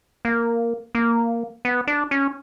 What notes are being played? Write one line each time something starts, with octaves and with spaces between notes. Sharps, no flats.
A#3
A#3
B3
D4
C#4